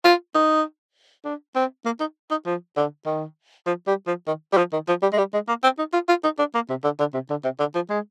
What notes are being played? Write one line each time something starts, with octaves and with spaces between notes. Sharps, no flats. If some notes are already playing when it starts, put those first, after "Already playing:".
F4
D#4
D4
C4
A#3
D#4
D#4
F3
D3
D#3
F3
G3
F3
D#3
G3
F3
D#3
F3
G3
G#3
G3
G#3
A#3
C4
D#4
F4
F4
D#4
D4
A#3
C3
D3
D3
C3
D3
C3
D3
F3
G#3